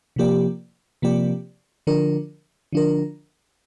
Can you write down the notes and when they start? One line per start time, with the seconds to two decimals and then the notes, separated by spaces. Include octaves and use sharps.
0.16 C3 F3 A#3 G4 D5
1.02 C3 F3 A#3 G4 D5
1.87 D3 F3 D4 A#4
2.73 D3 F3 D4 A#4